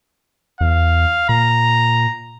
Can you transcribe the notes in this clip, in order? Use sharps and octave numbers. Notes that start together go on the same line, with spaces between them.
E2 F5
A#2 A#5